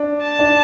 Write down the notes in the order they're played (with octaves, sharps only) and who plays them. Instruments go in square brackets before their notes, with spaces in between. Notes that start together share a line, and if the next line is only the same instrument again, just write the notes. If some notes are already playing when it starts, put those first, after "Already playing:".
Already playing: [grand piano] D4
[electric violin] A5
[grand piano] D4